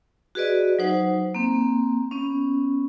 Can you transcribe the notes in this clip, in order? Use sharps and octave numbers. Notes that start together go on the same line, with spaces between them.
F#4 G#4 B4 D5 D#5
F#3 D#4 C5 F#5
A#3 C4
B3 C#4